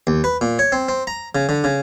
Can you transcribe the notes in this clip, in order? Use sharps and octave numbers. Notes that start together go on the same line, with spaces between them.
D#2
B4
A#2
C#5
C4
C4
A#5
C#3
D3
C#3